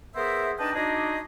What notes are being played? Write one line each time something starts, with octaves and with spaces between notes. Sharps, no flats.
B3 G#4 A#4 C5 E5
D4 D#4 B4 D#5 G5 A5
D4 D#4 F#4 G#4 D5 D#5